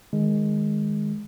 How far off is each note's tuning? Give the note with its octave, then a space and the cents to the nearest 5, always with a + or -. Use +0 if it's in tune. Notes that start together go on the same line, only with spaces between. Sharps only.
D#3 +0 G#3 +0